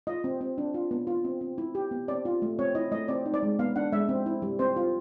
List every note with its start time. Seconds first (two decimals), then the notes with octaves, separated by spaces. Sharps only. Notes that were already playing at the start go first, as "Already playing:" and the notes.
0.07 F4 D#5
0.24 C4
0.41 C4
0.58 D4
0.74 F4
0.91 B3
1.07 F4
1.25 C4
1.41 C4
1.58 E4
1.75 G4
1.91 B3
2.08 C4 D5
2.25 F4
2.42 A3
2.59 C4 C#5
2.75 E4 D#5
2.91 A3 D#5
3.08 C4 D5
3.26 D#4
3.34 D5
3.43 G#3
3.59 B3 F5
3.76 D4 F#5
3.92 G#3 E5
4.09 C4
4.26 E4
4.42 G3
4.59 C4 C5
4.76 F4